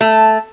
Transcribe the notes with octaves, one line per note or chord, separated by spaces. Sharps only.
A3